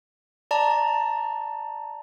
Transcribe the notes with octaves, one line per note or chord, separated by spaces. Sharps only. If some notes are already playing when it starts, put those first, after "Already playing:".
D5 A5 A#5